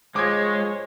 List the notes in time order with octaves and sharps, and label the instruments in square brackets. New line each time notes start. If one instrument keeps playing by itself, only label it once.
[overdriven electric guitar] G#3 [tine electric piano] F4 G#4 C5 [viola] C#5 [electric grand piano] D6 G#6